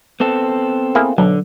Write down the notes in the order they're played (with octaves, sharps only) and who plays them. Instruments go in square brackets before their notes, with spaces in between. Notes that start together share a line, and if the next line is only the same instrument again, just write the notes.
[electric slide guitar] B3 C4 A4
[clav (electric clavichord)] A#3 E4 G#4
[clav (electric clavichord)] B1 [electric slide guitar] D3 [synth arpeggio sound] F#3